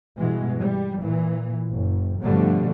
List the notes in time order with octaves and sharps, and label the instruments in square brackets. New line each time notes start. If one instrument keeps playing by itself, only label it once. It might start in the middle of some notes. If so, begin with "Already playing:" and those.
[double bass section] G2 B2 E3 G#3
G3
A#2 E3
F#1
G2 B2 D3 F3 G3 A3